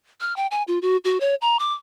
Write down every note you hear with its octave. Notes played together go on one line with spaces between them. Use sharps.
F6
G5
G#5
F4
F#4
F#4
C#5
A#5
D6